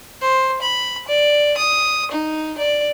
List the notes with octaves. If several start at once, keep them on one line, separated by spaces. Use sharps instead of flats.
C5
B5
D5
D#6
D#4
D5